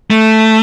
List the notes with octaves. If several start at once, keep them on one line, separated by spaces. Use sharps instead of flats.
A3